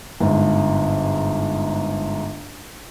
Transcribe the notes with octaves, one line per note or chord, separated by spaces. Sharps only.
G1 G#2